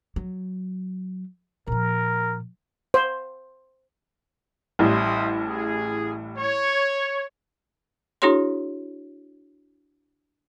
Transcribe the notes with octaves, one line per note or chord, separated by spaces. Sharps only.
F#3
A#2 F3 A#4
C5
A1 A2 G3 E4 C5 D#6
G#4
C#5
D4 E4 F#4 G#4 C#5 C6